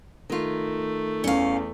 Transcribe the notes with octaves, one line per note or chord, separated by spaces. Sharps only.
D#3 A3 F4
E2 C#4 F5